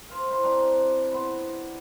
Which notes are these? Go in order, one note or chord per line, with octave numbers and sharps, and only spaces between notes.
C5 F5
E4 C5
C3 C4 D4 A#5
B3 E4 C5